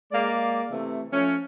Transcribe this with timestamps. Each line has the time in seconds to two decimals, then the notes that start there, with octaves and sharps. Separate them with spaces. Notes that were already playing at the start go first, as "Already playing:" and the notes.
0.12 G#3 A#3 D5
0.71 C3 E3 A3
1.13 F3 A3 C#4